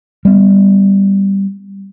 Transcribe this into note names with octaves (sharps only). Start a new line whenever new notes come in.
G3 B3